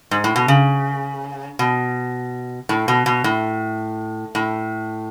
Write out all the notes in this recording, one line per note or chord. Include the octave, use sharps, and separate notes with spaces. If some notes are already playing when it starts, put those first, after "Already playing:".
G#2
A2
B2
C#3
B2
A2
B2
B2
A2
A2